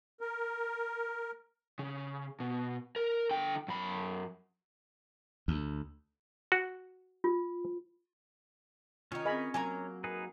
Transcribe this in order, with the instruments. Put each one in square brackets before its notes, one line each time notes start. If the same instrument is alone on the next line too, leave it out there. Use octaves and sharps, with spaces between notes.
[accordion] A#4
[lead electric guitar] C#3
B2
A#4
D3 G5
F#2 B5
[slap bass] D2
[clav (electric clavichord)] F#4
[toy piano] F4
[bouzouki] D#3 D#4 [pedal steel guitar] C#4 C#5 [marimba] F4 G5 F6
[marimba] C4 G#4 [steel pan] D#5 G#5 B5
[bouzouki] F#3 A#3 A#5 [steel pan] G#5
[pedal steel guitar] D#4 G#4 B4 [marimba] A#4